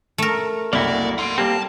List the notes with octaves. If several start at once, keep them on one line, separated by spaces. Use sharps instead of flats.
A3 A#4
F#1 C2 A#3 E4 F#4 D5
F#5 C6 C7 D7
G3 A#3 C4 G4 A5